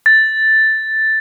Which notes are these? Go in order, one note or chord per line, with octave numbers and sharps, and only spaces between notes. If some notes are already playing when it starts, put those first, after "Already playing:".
A6